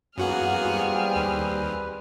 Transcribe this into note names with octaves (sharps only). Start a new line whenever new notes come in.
F#2 E3 A#3 B3 F#4 G#4 F#5 F6
G3 C4
D#2 B4